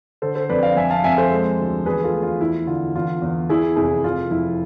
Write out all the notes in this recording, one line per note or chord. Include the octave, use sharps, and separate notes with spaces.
D3 A4 C5
A4 C5
F2 B4 D5
D5 F5
F2 E5 G#5
F5 A5
F2 E5 G#5
A4 C5
G#3
D2
E2 G#4 B4
F4 A4
A3
F4
E2 E4
D3 F4
E2 F4
E2
E2 E4 G#4
F1 E4 G#4
F1 F4
F2 E4